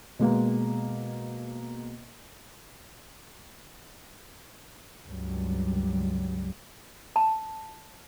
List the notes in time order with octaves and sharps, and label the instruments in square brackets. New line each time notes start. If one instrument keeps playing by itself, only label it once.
[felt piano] B2 G#3 A#3
[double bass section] C#2 G2 F#3 G3
[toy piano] A5